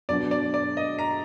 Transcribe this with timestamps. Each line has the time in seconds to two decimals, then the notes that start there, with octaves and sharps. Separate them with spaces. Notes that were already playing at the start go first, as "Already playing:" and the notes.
0.09 B2 F#3 D4 F#4 D5
0.31 D5
0.54 D5
0.77 D#5
0.99 A#5